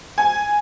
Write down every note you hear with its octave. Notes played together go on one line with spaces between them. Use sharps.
G#5